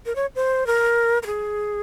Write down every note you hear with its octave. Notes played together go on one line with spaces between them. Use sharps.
A#4
C#5
C5
A#4
A#4
G#4